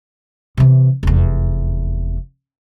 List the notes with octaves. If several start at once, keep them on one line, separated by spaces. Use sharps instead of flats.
C3 E3
F1 E2